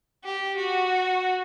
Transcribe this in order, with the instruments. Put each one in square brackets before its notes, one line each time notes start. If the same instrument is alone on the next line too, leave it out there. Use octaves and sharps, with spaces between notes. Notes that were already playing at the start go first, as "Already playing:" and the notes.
[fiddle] G4
F#4